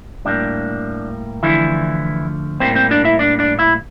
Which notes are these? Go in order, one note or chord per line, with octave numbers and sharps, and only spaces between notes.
A2 G3 A#3 D4
D3 E3 F3 A3 E4
A2 G3 A#3 C4 C5
C4 C5
D4 D5
E4 E5
D4 D5
D4 D5
E4 E5